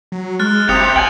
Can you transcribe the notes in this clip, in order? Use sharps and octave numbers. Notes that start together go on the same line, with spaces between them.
F#3
G#3 F6 F#6 A6
F#1 C3 D#6 C#7 F7
C3
B1 G5 G#5 F#7